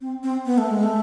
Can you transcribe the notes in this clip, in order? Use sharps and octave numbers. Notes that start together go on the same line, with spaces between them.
C4
C4
B3
A3
G#3
A3